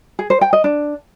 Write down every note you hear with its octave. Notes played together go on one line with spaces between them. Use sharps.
G#4
C5
G5
D#5
D4